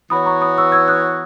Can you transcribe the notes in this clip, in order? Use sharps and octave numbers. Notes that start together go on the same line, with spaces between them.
E3 B3 F#4 C#5 B5 D#6
A#5 C#6
B5 D#6
C#6 E6
E6 G#6
D#6 F#6